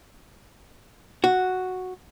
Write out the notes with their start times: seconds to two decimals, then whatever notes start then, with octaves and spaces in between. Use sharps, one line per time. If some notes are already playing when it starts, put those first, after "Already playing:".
1.24 F#4